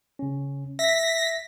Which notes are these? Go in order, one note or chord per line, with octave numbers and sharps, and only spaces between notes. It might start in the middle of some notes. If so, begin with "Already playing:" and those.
C#3 C#4
E5 A#6 B6